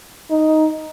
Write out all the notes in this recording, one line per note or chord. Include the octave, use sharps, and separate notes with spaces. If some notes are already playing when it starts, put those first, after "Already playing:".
D#4